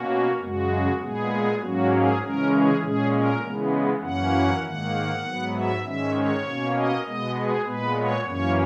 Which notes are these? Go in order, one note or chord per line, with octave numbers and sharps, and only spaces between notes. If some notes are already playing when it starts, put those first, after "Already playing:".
Already playing: B2 A#3 C#4 F#4
F#2 C#3 G#3 F#4
A#2 G#3 B3 G#4
G#2 F#3 A#3 C#4 F#4
G#4
C#3 E3 G#3 C#4 A#4
G#4
A#2 G#3 C#4 G#4
A#4
C#3 E3 G#3 B3
F#2 E3 A#3 C#4 F#5
G#2 D#3 A#3 F#5
G#2 F#3 B3
E5
G#2 D#3 G#3 C#4 E5
C#5
B2 A#3 C#4
D#5
B2 G#3 B3 D#5
G#4
A#2 G#3 B3 B4
C#5
F#2 E3 A#3 C#4 C#5